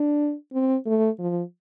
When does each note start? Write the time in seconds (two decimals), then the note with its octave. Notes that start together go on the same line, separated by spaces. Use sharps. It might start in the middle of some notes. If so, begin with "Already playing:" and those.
Already playing: D4
0.53 C4
0.86 A3
1.19 F3